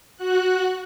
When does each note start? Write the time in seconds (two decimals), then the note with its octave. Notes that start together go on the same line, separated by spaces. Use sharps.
0.17 F#4 F#6